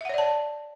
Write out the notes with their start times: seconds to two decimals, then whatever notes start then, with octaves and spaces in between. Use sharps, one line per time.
0.01 E5
0.05 F#5
0.09 C#5
0.14 D5
0.18 A5